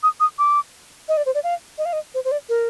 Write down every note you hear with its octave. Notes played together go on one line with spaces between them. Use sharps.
D#6
D#6
D6
D#5
D5
C5
D5
F5
D#5
F5
D#5
C5
C5
D5
A#4